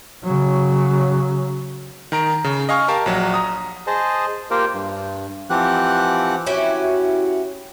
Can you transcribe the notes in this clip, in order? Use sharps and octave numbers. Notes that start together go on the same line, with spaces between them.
C#3 F#3
D#3 A#5 D7
C#3
D#5 F5 G#5 C#6 F6
G4 A#4 F5 A5
A#1 F#3 F#4
A#5 D#6
G#4 C5 D#5 A5
A#3 F4 G4 A#4 C5 G5
G2
E3 F3 C4 G4 F#5 F#6
C#4 E4 F#4 G4